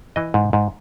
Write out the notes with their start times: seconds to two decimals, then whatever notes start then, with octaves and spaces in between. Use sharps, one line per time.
0.16 E3 D#5
0.34 G#2
0.53 G#2